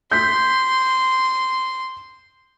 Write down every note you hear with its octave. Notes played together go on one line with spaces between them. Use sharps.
C6 G6 B6